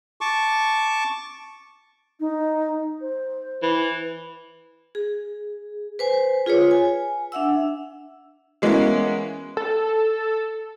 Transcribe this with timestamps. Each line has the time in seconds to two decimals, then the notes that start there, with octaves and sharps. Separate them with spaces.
0.21 A5 C#6 D6
2.20 D#4
3.01 C5
3.63 E3
4.95 G#4
5.99 B4 C5 G#5
6.46 F4 G#4 B4 C#5
6.71 G#5
7.32 D4 E5 F#5 E6
8.62 E3 G#3 A#3 B3 C#4 E4
9.57 A4